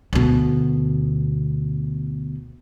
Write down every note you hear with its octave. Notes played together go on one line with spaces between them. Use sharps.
D2 B2